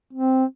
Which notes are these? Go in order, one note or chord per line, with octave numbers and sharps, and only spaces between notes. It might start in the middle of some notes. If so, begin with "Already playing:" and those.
C4